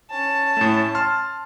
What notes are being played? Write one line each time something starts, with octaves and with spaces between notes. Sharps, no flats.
C#4 A5
A2 A3
A5 C6 F6